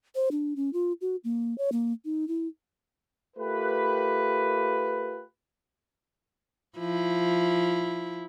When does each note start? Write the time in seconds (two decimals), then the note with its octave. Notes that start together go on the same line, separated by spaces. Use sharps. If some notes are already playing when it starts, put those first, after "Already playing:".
0.15 C5
0.31 D4
0.56 C#4
0.73 F4
1.01 F#4
1.24 A#3
1.58 C#5
1.72 A#3
2.05 D#4
2.28 E4
3.37 A3 F4 G4 A#4 B4
6.78 F3 E4